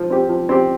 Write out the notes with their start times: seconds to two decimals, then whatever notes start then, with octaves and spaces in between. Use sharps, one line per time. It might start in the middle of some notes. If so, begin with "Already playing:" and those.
Already playing: F3
0.10 C4 G4
0.29 F3
0.49 C4 G4